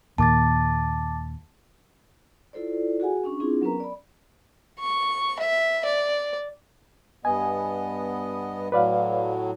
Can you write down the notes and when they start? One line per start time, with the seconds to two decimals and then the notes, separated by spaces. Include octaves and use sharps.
0.18 D#2 A#2 A5 D6 A6
2.53 E4 F4 A4 C5 D5
3.00 F#4 G#4 F#5 G#5
3.24 C#4 D4 C#6
3.40 C4 D4 E4 F4 G#4
3.61 F#3 B3 C#4 A#4 B4 A#5
3.80 D5 B5
4.80 C#6
5.39 E5
5.85 D5
7.25 G2 B3 D#5 G#5
8.72 A2 F#3 B4 D5 F5